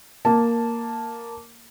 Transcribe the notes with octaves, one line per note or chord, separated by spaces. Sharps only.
A#3 A5